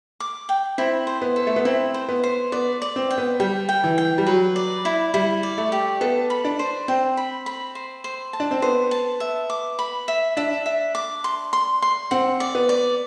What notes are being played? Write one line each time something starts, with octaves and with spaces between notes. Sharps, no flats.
D6
G5
C4 E4
C5
B3
A4
A3
B3
C4 E4
C5
B3
C5
B3 D5
D5
C4
G5
B3
G3 G5
G5
E3
G5
G3
F#3 B4
D5
E4
G3 E4
D5
A3
G4
B3 A4
B5
D4
C5
C4 G5
B5
B5
C5
C5
A5
D4
C4
B3 C5
A5
E5
D6
B5
E5
D4 E5
E5
D6
C6
C6
C6
C4 F#5
D5
B3
D5